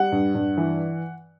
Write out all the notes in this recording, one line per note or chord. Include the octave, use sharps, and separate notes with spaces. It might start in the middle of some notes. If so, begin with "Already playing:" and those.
Already playing: G3 F#5
G2
G2
E3